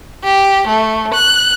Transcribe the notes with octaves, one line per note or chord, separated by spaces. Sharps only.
G4
A3
F#6